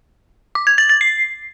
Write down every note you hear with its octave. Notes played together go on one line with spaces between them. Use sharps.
D6
G#6
A6
A6
C7